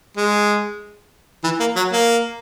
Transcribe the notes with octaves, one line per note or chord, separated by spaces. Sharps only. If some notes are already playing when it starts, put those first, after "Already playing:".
G#3
E3
A#3
F#3
A#3